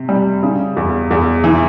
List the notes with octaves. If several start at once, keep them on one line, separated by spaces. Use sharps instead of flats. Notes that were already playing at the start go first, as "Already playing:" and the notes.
Already playing: C3
G3
C#3
E2
E2
E3